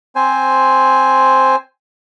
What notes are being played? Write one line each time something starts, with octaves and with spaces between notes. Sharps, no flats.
C4 C5 G#5